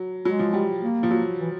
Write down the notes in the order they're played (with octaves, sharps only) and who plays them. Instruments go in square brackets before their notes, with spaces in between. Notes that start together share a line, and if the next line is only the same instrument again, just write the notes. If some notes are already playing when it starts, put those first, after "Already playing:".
Already playing: [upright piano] F#3
[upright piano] F#3 [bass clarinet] G#3
[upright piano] F3
G3
[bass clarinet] A#3
[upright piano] F3
F#3
[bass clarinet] E3